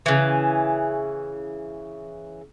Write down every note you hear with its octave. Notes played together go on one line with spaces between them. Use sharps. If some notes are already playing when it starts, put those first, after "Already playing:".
C#3 E3